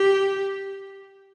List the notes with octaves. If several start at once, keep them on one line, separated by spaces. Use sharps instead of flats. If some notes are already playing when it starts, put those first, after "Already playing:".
Already playing: G4